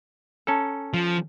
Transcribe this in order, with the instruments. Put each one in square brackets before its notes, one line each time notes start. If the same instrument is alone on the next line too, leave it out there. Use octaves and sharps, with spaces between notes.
[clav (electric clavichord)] C#4 A4 [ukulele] A5 A#5
[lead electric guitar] F3